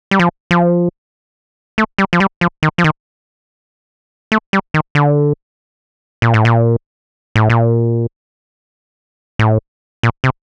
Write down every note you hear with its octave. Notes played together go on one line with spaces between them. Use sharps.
G3
F3
F3
A3
G3
F3
G3
F3
D#3
F3
D#3
A3
G3
D#3
D3
A#2
A2
A#2
A2
A#2
A2
A#2
C3